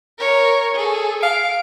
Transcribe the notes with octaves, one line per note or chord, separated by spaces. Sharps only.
A#4 C#5
G#4 A4
F5 D7